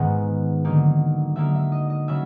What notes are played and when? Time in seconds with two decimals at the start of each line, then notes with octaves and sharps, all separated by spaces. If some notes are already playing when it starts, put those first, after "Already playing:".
Already playing: G#2 D#3 G#3 B3 F#5
0.65 D3 F#3 A#3 D#4
1.36 D3 F#3 A#3 D#4 E5
1.55 E5
1.72 D#5
1.90 D#5
2.08 C#3 F#3 E5